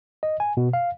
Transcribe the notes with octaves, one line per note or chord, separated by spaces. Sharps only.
D#5
G#5
B2
F5